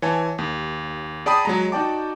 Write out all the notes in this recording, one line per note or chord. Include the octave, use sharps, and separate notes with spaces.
E3 C#5 G#5 A5
D#2
G#4 D5 G5 A5 B5 D#6
F#3 G#3 A#5
D#4 F#4 D5 G5 A5 D6